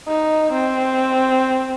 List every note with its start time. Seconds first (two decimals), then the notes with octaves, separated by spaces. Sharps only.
0.08 D#4
0.53 C4